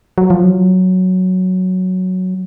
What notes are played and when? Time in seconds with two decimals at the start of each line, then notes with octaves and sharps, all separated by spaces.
0.18 F#3
0.30 F3
0.44 F#3